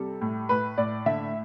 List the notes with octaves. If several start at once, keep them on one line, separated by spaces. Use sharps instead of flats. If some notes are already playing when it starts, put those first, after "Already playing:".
Already playing: C3 G3 A4
A2
A2 B4
A2 D5
D3 E5